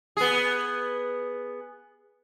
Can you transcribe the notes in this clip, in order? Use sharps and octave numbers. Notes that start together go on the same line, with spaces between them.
B3 G#4